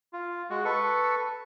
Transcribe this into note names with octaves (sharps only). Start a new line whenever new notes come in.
F4
G#3 F#4
A4 B4 C#6